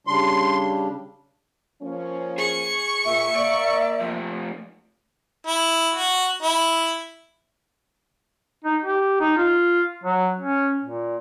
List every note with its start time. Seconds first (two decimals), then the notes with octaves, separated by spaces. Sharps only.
0.07 C#3 G3 D4 C6
1.82 F3 A#3 C#4
2.38 G#4 C#6
3.05 A#2 E5
3.36 A#3 D5
4.02 F3 A3
5.47 E4
5.95 F#4
6.43 E4
8.64 D#4
8.84 G4
9.20 D#4
9.38 F4
10.04 F#3
10.40 C#4
10.84 A#2